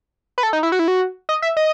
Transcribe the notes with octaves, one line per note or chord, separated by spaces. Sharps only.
B4
A4
D#4
E4
F#4
E4
F#4
D#5
E5
D#5